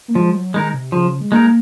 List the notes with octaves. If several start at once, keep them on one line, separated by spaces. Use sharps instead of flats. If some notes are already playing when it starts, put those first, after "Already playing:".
A#3
F3 G#3
F#3
D#3 G#3 D#4 A#4
C3
C#3 F3
G#3
G#3 A#3 D#4 A#4